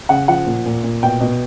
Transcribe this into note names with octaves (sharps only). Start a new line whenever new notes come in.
C#3 F#5
F3 F#5
A#2
A#2
A#2
B2 G5
B2